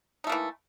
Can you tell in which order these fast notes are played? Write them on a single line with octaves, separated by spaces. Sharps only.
D#4 A3 A#3 E3